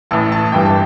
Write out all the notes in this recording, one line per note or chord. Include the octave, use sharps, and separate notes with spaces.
A1 A2 E3 A5
A5
G1 G2 E3 G3 G5
A5